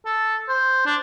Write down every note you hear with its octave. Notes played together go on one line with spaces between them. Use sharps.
A4
C5
D4